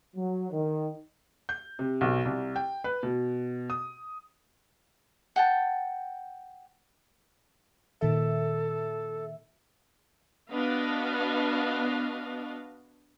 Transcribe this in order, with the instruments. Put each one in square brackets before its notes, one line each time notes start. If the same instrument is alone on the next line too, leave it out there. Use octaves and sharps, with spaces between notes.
[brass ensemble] F#3
D#3
[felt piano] G6
C3
B1
C2
G5
B4
B2
D#6
[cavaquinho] F#5 G5 A5
[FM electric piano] A#2 D#3 E5 [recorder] A4
[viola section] B3 D4 F#4 B4 D#5 F5